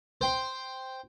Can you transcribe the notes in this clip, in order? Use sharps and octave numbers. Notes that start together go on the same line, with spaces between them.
C5 G5 C6